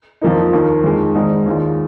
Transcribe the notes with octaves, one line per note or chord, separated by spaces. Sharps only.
F2 F3 A#3 D#4
D#2 D#3 A#3
F2 D#3 G#3
G#1 G#2 G#3 D#4
D#2 D#3 G#3 F4